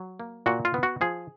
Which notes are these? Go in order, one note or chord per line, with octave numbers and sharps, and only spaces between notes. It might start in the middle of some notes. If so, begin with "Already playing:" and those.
Already playing: F#3
A#3
A#2 F#4
F4
B3
F#4
F3 G#4